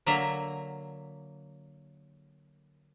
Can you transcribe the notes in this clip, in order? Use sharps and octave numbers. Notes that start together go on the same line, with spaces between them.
D3 F#3 A#3 E5 A#5